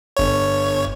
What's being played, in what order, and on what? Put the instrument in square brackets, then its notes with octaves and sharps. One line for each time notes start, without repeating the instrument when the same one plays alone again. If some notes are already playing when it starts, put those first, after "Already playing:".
[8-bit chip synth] G1 C#5